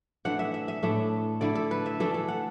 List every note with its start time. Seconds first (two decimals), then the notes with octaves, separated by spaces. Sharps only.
0.25 E3 A3 D4 F#5
0.39 E5
0.54 E5
0.68 E5
0.83 A2 A3 D4
1.41 D3 A3 E4 D5
1.55 A4
1.71 B4
1.86 E5
2.00 E3 A3 D4 A4
2.14 A4
2.28 F#5